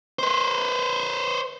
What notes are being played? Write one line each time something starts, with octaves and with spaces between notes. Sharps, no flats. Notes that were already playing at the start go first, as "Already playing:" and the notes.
B4 C5